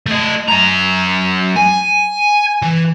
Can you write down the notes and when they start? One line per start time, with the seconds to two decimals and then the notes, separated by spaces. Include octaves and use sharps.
0.07 A3 D#5
0.48 F#2 A#5
1.56 G#5
2.63 E3